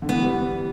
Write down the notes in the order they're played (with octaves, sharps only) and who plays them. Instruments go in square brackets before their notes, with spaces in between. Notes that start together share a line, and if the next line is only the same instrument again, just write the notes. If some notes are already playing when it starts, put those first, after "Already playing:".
[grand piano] D3
[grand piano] E3 [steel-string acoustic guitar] B3
[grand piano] G3